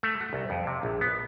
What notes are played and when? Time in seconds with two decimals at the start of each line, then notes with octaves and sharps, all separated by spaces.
0.03 A3
0.21 F#4
0.33 C2
0.50 F2
0.67 C3
0.83 A#1
1.01 B3